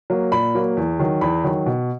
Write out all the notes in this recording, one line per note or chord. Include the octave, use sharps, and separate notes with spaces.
F#3 A#3
A#2 B5
F#3 A#3
E2
D#3 F#3
E2 B5
D#3 F#3
B2